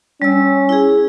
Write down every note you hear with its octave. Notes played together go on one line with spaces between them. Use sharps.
G3 C#4 E6
E4 G#4